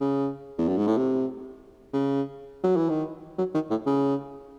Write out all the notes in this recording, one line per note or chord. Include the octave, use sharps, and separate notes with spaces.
C#3
E2
F#2
G#2
A2
C3
C#3
F#3
E3
D#3
F#3
D#3
A2
C#3